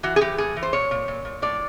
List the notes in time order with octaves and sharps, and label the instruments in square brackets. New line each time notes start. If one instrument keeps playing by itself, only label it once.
[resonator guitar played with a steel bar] E3 F#4
G#4
E3 G4
A2 G#4
E3
C5
A#2 C#5
A#2
A#2
A#2
A2 D5